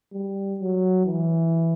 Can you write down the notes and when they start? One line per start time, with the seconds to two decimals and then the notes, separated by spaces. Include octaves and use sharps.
0.13 G3
0.59 F#3
1.05 E3